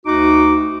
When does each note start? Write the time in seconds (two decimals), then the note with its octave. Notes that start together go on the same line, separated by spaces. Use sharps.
0.06 D2 D#4 F#4 D6